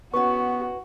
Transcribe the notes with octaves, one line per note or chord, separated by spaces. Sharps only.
B3 C#4 E4 F#4 B4 C#6